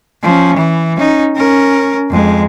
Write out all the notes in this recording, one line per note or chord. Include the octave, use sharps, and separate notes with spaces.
F3 C#4
E3
C#4 D#4
C#4 A#4
F2 G#3